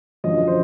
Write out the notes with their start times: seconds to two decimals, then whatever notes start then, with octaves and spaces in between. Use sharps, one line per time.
0.24 F#2 D3 F3 D#5
0.48 C5